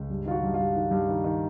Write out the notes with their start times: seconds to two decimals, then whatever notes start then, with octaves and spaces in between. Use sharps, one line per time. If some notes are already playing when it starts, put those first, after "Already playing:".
Already playing: C#2
0.10 G2
0.26 D#3 F4
0.31 F#4
0.43 G2
0.54 F4
0.59 G2
0.76 D#3
0.91 G2
1.09 D#3
1.24 D#3